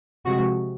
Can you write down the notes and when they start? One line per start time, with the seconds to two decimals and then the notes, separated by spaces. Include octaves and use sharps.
0.25 C3 F3 G#3 F#4